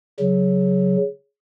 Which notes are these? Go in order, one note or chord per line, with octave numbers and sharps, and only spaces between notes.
C#3 F#3